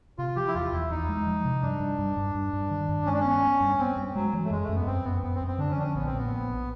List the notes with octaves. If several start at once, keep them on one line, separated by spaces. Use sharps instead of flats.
C3 F4
F3 G4
E4
E2 F4
E2 E4
E2 D#4
G#3
F3
C3
G2 D4
G2
G2
G2
G2
G2
D#3
G2
G#3 C#4
D4
B3 C#4
B3
G2
B3 C4
G2
F#3 G#3
E3
A3
F#2 G#3
A3
F#2
B3
F#2 C4
F#2 B3
F#2 B3
C4
F#2
C4
D3 D4
C#4
F3 D4
C#4
A#1 B3
C4
A#2 B3
A#2
A#1